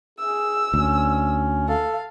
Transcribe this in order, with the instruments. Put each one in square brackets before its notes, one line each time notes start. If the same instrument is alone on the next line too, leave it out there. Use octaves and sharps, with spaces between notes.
[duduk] G#4 [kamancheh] E6
[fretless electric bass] D2 [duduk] C#4
[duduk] A4 [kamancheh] F5